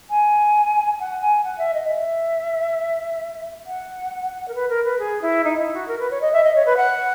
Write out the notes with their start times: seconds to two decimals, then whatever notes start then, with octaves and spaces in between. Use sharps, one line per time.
0.10 G#5
0.99 F#5
1.21 G#5
1.44 F#5
1.58 E5
1.73 D#5
1.88 E5
3.66 F#5
4.48 A#4
4.54 B4
4.69 A#4
4.84 B4
4.99 G#4
5.21 E4
5.44 D#4
5.58 E4
5.74 F#4
5.87 A#4
5.99 B4
6.10 C#5
6.21 D#5
6.33 E5
6.43 D#5
6.55 C#5
6.65 B4
6.77 F#5